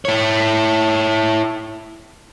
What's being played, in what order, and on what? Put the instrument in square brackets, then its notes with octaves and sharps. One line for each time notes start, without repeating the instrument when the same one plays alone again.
[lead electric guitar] E4 C#5